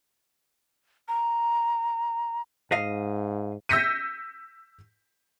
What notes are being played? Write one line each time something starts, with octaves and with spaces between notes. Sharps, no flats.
A#5
G#2 D#5 F5
E6 G6 A#6 B6 C#7 D#7